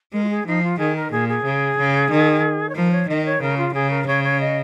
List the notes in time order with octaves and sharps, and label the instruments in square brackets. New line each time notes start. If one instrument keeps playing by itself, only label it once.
[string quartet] G#3 [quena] A#4
[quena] F4
G#4
[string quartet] F3 [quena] D#4
[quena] F4
[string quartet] D#3 [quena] G#4
[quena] A#4
[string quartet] A#2 [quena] G#4
[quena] G#4
[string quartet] C#3
C#3
D#3
[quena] C#5
[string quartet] F3 [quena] A#4
[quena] C#5
[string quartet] D#3 [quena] D#5
[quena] C#5
[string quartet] C#3 [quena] A#4
[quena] F4
[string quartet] C#3 [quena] G#4
[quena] A#4
[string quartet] C#3 [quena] C#5
[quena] C#5
D#5